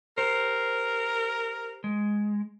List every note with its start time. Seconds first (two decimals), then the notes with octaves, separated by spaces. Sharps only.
0.18 G4 A#4 C5
1.84 G#3